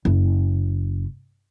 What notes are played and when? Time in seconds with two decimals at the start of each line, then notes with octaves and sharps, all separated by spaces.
0.05 F#1